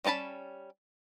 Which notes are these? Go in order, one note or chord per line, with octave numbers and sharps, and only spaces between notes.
G3 C#4 D#4 A5 B5